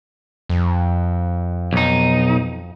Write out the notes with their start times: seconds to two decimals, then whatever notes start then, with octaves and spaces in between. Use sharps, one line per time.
0.49 F2
1.73 B1 D#4